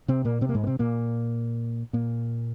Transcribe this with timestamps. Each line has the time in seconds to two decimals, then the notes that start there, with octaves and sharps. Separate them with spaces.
0.08 C3 C4
0.25 A#2 A#3
0.41 C3 C4
0.49 A#3
0.54 G#2 G#3
0.63 A#3
0.67 C3 C4
0.79 A#2 A#3
1.93 A#2 A#3